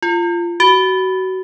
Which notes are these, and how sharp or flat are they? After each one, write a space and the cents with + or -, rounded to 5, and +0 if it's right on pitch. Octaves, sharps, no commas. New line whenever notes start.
F4 -20
F#4 +25